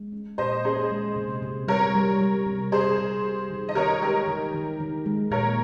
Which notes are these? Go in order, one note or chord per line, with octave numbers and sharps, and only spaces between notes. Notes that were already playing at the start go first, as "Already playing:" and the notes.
Already playing: G#3
C#4
A#2 C5 D#5
C#4 G#4 C5
G#3
C3
C3
G3 A#4 C#5
G3
G3
C3
C3 G#4 C5
C3
G4
D#3
D#5
D#3 A#4 C#5
G#3 G4 A#4
D#3
D#3
D#3
G#3
A#2 A#4 C#5